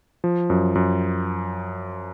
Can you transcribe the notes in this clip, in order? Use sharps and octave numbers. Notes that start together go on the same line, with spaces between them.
F3
F#2
F#2